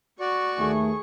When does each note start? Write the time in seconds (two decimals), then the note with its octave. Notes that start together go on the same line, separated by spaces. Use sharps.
0.20 F#4 D5 C#6
0.59 D#2 A3 G#4